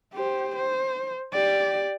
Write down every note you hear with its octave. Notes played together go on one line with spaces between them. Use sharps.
G4 C5
C5
G4 D5